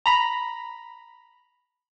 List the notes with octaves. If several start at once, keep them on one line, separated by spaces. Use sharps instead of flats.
A#5 B5